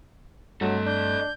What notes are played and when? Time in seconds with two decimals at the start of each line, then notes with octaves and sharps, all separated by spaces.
0.61 G2 F#3 A3 A4 D#5
0.86 D4 G6